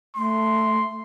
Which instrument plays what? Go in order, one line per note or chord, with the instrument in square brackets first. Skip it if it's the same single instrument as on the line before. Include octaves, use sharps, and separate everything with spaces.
[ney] A3 [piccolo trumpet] C6